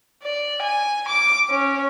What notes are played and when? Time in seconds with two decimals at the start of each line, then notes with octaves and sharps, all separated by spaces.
0.23 D5
0.62 G#5
1.09 D6
1.50 C#4